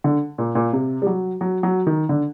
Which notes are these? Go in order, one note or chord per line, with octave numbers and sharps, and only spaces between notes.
D3
A#2
A#2
C3
G3
F#3
F#3
F#3
D#3
D3